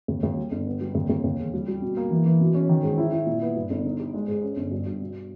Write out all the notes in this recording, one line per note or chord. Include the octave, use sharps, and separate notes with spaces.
D#2
D#2
G3
G1
B3
G3
D#2
D#2
D#2
E1
G3
G3
B2
A#3
E3
E3
B2
C#4
D#3
G#2
E4
E4
A#2
B3
G2
G1
D#4
G4
G#3
G#2
C#4
G1
G2
G2
B2